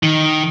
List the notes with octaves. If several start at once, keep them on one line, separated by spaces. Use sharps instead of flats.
D#3